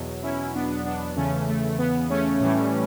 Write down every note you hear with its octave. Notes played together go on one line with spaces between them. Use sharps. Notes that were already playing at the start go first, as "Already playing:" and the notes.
Already playing: E2 B2 F#3
C#4 E4
B3 D4
B3 D4
E2 C#3 E3 A3 C#4
A3
B3
A3 C#4
A2 E3 G3